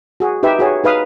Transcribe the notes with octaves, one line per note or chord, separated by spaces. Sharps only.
F#4 G#4
D#4 G4 B4 E5
F#4 G#4 C#5
D#4 B4 F5 D#6